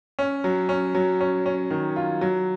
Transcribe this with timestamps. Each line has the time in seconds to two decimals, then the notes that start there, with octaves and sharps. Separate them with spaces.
0.19 C#4
0.44 F#3
0.69 C#4
0.95 F#3
1.21 C#4
1.46 C#4
1.71 D#3
1.96 F4
2.21 F#3